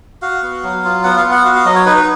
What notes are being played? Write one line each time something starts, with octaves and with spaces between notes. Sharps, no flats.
F#4 F5
B3
F#3
F4
B3 F#5
F5
B3
F#5
F#4 F5
F5
F#3 D#5
C#5
D#4 B4
B4